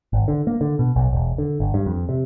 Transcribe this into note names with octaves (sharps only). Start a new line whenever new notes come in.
G#1
D3
A#3
D3
B2
B1
E1
D3
G1
G2
F2
C3